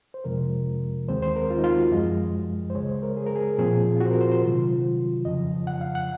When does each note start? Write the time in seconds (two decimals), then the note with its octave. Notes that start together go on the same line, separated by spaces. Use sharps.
0.14 C5
0.24 F2 C3 F3 G#3 A#4
1.08 D#2 D#3 G#3 C4 C5
1.23 C5
1.36 A#4
1.50 F4
1.59 D#4
1.64 F4
1.78 F#4
1.91 F#2 F3 G#3 D#5
2.70 C5
2.75 C#2 C#3 G#3 C#5
2.89 C5
3.03 A#4
3.17 G#4
3.26 A#4
3.35 G#4
3.58 A#2 F3 C4 G#4
3.96 F4
4.00 F#4
4.06 C5
4.10 A#4
4.21 C5
4.32 C5
4.42 C3 D#3 F#3 F4
5.25 F2 C#3 F3 D#5
5.67 F#5
5.81 F5
5.95 F#5